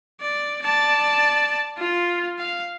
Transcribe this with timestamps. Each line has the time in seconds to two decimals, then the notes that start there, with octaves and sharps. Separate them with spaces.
0.20 D5
0.63 D5 A5
1.78 F4
2.39 F5